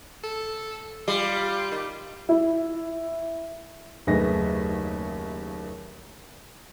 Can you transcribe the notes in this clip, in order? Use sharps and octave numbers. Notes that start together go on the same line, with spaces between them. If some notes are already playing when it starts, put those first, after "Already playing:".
A4
G3 F4
D#3
E4
F#1 D#2 A3 G#4 B4 A#6